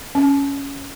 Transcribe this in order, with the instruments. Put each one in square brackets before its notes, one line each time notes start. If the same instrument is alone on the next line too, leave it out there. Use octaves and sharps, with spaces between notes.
[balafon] C#4